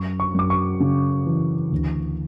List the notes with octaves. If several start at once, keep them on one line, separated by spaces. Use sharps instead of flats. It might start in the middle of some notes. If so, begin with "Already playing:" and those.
Already playing: F#2 C#6
C#6
F#2 D6
C#6
C#3
E3
D2